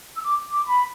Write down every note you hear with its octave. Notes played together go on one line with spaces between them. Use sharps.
E6
D6
D6
B5